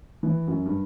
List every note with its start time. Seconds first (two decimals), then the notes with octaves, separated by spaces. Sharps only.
0.23 E3
0.47 F#2
0.66 G2